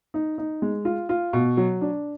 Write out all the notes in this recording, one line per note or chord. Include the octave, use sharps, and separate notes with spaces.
D#4
D#4
G#3
F4
F4
B2
F#3
D4